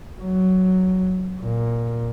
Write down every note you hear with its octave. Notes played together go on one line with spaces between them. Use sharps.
F#3
A#2